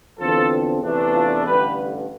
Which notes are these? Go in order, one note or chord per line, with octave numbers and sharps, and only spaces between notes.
E2 D3 F3 C4 F4 A4
E2 C3 E3 A3 D4
F4 A4
A1 G2 D3 G4 B4